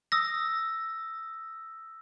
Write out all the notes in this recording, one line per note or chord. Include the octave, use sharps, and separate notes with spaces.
D#6 E6 A#6